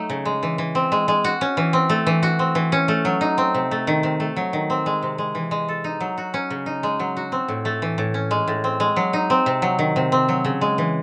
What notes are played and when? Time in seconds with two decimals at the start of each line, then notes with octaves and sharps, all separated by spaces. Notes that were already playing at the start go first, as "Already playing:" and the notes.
Already playing: F#3 A3 D#4
0.10 C#3
0.25 G#3
0.43 E3
0.58 E3
0.75 C4
0.92 G#3
1.08 G#3
1.24 F#4
1.41 C#4
1.57 E3
1.73 C4
1.90 A3
2.07 E3
2.23 F#4
2.39 C4
2.55 E3
2.72 C#4
2.88 A3
3.05 F#3
3.21 D#4
3.38 C4
3.55 C3
3.71 A3
3.87 D#3
4.03 C3
4.20 A3
4.36 F#3
4.53 D#3
4.70 C4
4.86 G#3
5.03 C3
5.18 G#3
5.35 E3
5.51 G#3
5.68 A4
5.84 D#4
6.00 F#3
6.18 F#4
6.34 C#4
6.50 C#3
6.66 D#4
6.83 G#3
7.00 F#3
7.17 F#4
7.32 C4
7.48 A2
7.65 A3
7.82 E3
7.98 A2
8.14 C#4
8.31 G#3
8.48 A2
8.64 C4
8.80 G#3
8.96 F#3
9.13 D#4
9.30 C4
9.46 C3
9.62 F#3
9.79 D#3
9.96 C3
10.12 C4
10.29 F#3
10.45 C#3
10.61 G#3
10.78 E3